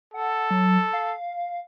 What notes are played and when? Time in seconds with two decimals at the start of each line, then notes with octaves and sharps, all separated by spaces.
0.14 A4 F#5
0.51 F#3
0.93 F5